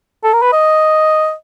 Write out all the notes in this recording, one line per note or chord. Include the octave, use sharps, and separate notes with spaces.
A4
A#4
B4
D#5